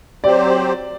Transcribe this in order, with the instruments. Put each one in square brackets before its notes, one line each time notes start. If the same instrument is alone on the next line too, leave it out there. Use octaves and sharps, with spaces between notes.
[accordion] F#3 C4 G4 C5 [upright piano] D5